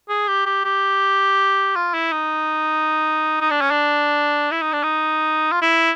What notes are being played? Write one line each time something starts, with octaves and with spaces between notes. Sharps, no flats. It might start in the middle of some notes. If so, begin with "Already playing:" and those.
G#4
G4
G4
G4
F4
E4
D#4
D#4
D4
C#4
D4
E4
D#4
D4
D#4
F4
E4